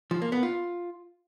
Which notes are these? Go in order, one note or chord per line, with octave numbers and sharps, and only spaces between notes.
F3
A#3
B3
F4